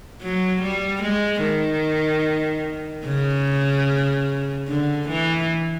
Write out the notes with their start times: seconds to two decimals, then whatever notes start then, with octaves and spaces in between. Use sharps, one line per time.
0.22 F#3
0.62 G3
1.03 G#3
1.43 D#3
3.06 C#3
4.68 D3
5.09 E3